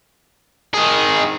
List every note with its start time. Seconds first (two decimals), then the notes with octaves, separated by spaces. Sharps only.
0.74 D#3 G#4